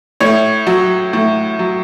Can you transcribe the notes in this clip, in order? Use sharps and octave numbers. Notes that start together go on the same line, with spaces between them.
A2 C#5
F#3
A2
F#3